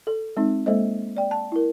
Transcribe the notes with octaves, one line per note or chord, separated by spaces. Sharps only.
A4
G#3 C4 D#4
G#3 A#3 A4 C5 D#5
D5 G5
A5
E4 A#4